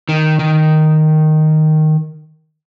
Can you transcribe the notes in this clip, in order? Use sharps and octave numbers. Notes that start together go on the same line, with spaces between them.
D#3
D#3